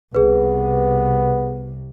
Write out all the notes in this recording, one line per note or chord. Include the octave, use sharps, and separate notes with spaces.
C2 C3 B3 G#4 B4